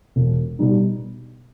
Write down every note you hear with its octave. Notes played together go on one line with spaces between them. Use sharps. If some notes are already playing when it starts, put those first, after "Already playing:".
E1
B2 G3 D#4